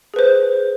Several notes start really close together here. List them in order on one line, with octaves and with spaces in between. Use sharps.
G#4 B4 C5